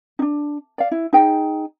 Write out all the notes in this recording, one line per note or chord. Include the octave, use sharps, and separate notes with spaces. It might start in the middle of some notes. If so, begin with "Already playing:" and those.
D4 D#4
D5 F5
E4
D#4 G#4 G5